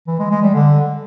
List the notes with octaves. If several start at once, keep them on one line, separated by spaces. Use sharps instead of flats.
E3
G#3
G#3
G3
D3